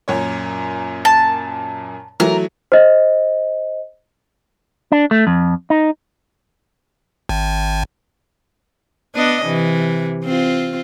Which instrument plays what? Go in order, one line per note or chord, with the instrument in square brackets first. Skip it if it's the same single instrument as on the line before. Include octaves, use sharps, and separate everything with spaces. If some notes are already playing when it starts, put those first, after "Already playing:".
[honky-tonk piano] F#2 A#2 C#5
[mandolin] A5
[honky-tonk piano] E3 F#3 A3 [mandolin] A#4
[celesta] C5 D#5
[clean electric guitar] D4
A3
F2
D#4
[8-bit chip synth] G#1
[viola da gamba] B3 D4 D#5
C3 E3
C4 F4